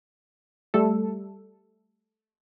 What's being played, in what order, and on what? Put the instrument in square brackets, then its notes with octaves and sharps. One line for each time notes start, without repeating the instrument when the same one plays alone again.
[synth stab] G3 A3 A4